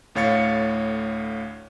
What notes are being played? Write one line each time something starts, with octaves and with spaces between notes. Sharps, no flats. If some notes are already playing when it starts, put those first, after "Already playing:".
D2 A2 C#5 F5 A6 C#7